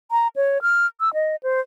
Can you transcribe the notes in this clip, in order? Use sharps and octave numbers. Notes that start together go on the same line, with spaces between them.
A#5
C#5
F6
E6
D#5
C5